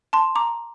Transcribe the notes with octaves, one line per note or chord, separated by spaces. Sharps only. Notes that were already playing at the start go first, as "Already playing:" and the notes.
A5 C6
A#5 D6